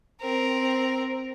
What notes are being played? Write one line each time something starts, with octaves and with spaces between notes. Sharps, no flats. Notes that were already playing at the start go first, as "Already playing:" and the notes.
C4 A#4